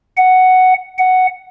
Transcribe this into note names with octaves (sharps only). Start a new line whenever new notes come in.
F#5
F#5